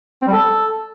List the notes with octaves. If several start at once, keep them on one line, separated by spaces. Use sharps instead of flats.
C4
G3
A4